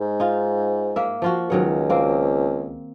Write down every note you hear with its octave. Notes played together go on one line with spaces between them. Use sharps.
G#2
D#4 F4
A#3 E5
F3 F4 F#4
C#2 D#3 F#3 F#5
A#3 C4